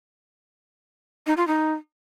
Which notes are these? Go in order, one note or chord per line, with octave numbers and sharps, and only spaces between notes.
D#4
F4
D#4